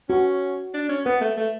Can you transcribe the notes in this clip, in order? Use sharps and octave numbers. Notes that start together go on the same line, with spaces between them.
C#4 F#4
D4
C#4
B3 B4
A3
A3